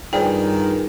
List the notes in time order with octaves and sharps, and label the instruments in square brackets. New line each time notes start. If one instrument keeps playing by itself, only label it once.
[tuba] G2 [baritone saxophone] D#3 [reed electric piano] F4 G#4 B4 [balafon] C5 D5 G5